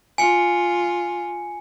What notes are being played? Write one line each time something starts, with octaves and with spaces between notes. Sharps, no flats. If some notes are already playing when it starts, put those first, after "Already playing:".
F4 G#5 C#7